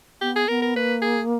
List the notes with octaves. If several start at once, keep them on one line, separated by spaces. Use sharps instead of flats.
B3 G4
G#4
B3 A#4
A#4
A#3 B4
G#4